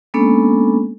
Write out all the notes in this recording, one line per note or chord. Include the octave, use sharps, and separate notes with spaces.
G#3 A#3 B3 C#4 D4 A4